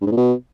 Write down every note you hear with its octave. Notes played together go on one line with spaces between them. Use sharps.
G2
G#2
A#2
B2